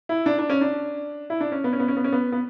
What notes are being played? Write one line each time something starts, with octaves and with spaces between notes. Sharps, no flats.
E4
D4
D4
C#4
D4
E4
D4
C#4
B3
C#4
B3
C#4
B3
C#4
B3
B3